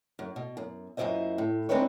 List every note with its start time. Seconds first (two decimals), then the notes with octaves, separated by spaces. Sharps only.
0.19 F#2
0.36 B2
0.57 F#2
0.97 F#2 A#2 F#3 E4 C5 D#5
1.38 A2
1.69 G#3 C4 D4 D#4 B4 C#5